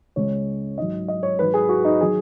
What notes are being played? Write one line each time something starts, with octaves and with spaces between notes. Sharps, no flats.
C#2 C#3 G#3 C#5
G#2 F#3 D#5
D#5
C#5
G#2 F#3 B4
G#4
F#4
D#4
D#3 F#3 G#4